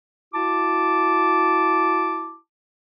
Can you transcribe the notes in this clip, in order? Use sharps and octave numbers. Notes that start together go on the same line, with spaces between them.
E4 F#4 A5 D6